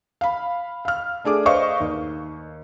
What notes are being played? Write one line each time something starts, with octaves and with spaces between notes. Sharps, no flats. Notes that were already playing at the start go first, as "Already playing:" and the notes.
F5 B5
F5 F6
A3 D4 G#4 D6
B4 C5 D5 D#5 F5 C#6
D#2